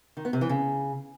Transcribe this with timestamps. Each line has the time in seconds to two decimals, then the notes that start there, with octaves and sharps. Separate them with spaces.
0.17 D#3
0.25 B3
0.33 C3
0.41 E3
0.49 C#3